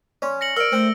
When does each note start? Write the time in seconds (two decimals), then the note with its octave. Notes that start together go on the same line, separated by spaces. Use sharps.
0.22 C#4 D5 C6 C#6
0.41 A#6 C#7 F#7
0.57 A#4 C5 D5 F5 E6 D7
0.72 A3 C4